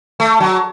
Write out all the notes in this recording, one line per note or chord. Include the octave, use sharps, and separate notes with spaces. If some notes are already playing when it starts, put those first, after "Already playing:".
A3
F#3